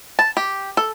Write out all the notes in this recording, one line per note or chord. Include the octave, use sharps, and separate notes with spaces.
A5
G4
A4